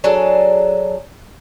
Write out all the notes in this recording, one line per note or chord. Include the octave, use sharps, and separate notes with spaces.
F#3 D4 G#4 A4